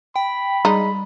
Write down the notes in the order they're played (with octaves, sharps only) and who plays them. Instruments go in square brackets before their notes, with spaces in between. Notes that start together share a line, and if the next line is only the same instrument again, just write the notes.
[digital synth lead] G5 [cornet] B5
[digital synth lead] G3 [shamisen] G#3 D#4